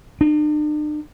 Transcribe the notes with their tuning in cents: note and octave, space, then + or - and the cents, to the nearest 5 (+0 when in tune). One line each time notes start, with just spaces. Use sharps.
D4 +45